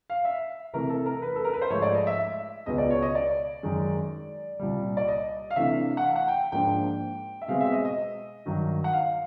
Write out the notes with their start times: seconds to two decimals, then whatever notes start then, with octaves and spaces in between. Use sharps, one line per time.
0.10 F5
0.25 E5
0.73 C3 E3 A3 A#4
0.90 A4
1.06 A#4
1.22 B4
1.36 A4
1.45 A#4
1.53 B4
1.62 C5
1.70 G#2 F3 A3 C#5
1.82 D5
1.94 D#5
2.07 E5
2.18 E5
2.66 C#2 B2 G#3 B3 D#5
2.78 D5
2.90 C#5
3.02 D#5
3.15 D5
3.63 F#2 D#3 G#3
4.59 C2 A#2 G3
4.97 D5
5.08 D#5
5.51 F5
5.56 C3 E3 A3 D4 E5
5.97 F#5
6.04 F5
6.16 F#5
6.28 G5
6.52 G#2 F3 A#3 D4 G5
7.42 E5
7.48 B2 G#3 C4 F5
7.61 E5
7.72 D#5
7.85 D#5
8.46 G2 D#3 F#3
8.84 F#5
8.93 F5